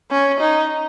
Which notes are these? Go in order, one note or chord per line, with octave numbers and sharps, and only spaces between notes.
C#4
D#4